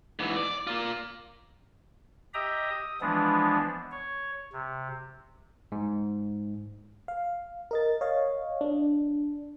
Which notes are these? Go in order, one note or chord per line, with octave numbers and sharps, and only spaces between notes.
G#2 E3
D5
A#3 F4
G4 D#5 E5 G5 A#5 D#6
D#6
E3 F3 G#3 B3 D4
C#5
C3
G#2
F5
A#4 D#5 A6
C#5 D#5 F5
D4